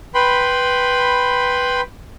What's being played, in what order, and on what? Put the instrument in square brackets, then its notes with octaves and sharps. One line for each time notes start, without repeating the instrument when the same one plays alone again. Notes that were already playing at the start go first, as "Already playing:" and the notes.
[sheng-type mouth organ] B4 G5 B5 C6